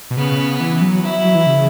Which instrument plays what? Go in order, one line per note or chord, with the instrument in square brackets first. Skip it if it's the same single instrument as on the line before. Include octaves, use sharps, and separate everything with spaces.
[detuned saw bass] B2
[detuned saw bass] C#3 [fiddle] B3
[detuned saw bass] E3
F#3
[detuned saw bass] F#3 [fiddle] E4
[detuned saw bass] F#3
E3
C#3